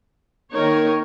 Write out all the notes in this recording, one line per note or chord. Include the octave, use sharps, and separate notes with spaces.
D#3 A#3 D#4 A#4 C#5